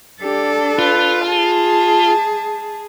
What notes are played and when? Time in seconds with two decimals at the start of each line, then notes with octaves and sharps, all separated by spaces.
0.22 D4 G4 A4
0.79 F4 B4
1.27 G#4 A5